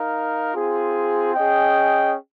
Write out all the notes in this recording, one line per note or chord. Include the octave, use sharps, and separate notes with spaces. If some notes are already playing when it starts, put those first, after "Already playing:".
Already playing: D#4 A#4 F5
C4 F4 G#4
C#4 G#4 D#5 G5